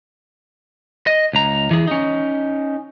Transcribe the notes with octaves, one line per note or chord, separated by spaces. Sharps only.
D#5
C#2 A#5
E3 G#4
C#4 D#4